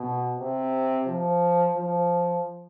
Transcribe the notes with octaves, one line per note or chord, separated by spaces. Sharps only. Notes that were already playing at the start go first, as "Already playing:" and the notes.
Already playing: B2
C3
F3
F3